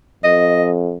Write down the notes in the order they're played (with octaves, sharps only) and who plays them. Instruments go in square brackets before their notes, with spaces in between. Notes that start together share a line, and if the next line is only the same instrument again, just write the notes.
[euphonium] F2 [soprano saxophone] D#5